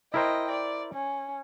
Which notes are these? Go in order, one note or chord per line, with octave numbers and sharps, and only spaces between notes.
E4 A#4 C5 D#5 G5
D5
C#4